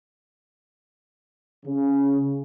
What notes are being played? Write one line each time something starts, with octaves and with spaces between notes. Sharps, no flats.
C#3